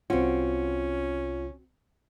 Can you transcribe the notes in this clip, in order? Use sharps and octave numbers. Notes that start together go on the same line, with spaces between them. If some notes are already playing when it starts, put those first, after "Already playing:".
C2 C4 C#4 F4 F#4